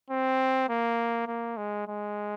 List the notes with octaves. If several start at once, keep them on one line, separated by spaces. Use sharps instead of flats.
C4
A#3
A#3
G#3
G#3